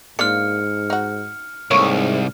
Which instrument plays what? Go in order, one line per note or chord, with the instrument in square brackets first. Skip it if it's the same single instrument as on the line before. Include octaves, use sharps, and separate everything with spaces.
[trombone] G#2 [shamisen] A#3 D4 F4 [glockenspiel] F6 C#7
[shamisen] D#4 F#4
[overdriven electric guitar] C2 [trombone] G#2 [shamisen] A3 A#3 C#5